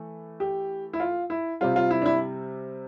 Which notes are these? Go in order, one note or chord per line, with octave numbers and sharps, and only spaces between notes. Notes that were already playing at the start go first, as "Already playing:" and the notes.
Already playing: E3 A3
G4
E4
F4
E4
C3 G3 C4 F4
F4
E4
D4
E4